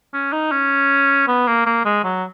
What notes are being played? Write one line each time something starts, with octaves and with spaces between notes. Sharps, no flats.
C#4
D#4
C#4
B3
A#3
A#3
G#3
F#3